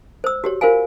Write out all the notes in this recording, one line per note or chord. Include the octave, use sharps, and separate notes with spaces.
C5 E6
F#4 G4 C#5
F4 A#4 C5 F5 G#5